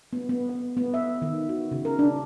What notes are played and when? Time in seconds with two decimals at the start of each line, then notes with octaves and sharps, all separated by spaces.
0.13 B3
0.29 B3
0.49 B3
0.77 B3
0.94 E5
1.22 D#3
1.49 F#4
1.71 C#3
1.85 A#4
1.99 D4